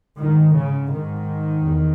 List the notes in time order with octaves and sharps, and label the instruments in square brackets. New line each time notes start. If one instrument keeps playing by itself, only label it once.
[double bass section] G#2 D#3
C#3
G#2 D#3
E2